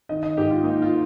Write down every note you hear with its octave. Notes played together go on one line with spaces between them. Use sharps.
D#3 D#5
D#5
G#2 G4
F4
A#3 D#4
F4